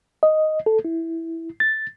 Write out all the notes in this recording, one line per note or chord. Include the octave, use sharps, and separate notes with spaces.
D#5
A4
E4
A6